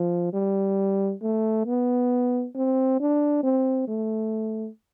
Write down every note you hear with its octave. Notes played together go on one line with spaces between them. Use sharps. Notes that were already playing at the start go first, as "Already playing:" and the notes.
Already playing: F3
G3
A3
B3
C4
D4
C4
A3